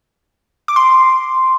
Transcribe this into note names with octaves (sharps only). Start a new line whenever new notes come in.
D6
C6